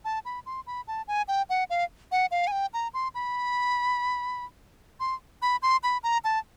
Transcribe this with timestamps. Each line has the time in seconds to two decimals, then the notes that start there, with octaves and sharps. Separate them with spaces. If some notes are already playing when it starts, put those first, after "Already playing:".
0.05 A5
0.25 B5
0.46 C6
0.67 B5
0.88 A5
1.08 G#5
1.28 G5
1.50 F#5
1.70 F5
2.12 F#5
2.31 F5
2.47 G#5
2.52 G5
2.74 A#5
2.94 C6
3.15 B5
5.00 C6
5.42 B5
5.62 C6
5.83 B5
6.03 A#5
6.24 A5